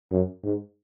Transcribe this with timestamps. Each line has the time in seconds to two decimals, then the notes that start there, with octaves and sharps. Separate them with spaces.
0.11 F#2
0.44 G#2